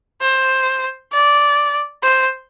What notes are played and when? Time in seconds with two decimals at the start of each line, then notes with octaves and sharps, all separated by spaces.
0.22 C5
1.13 D5
2.03 C5